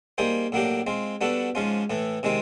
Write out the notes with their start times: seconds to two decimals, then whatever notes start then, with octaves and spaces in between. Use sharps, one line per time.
0.18 G3 A#3 D#4 G#4 C5
0.52 A2 F#3 A#3 D4 G4
0.87 G#3 C4 F4
1.21 G3 B3 D4 F#4 A4
1.55 G#2 F3 G#3 C#4 F4
1.90 A2 E3 A3
2.23 C3 D#3 G#3 C4 D#4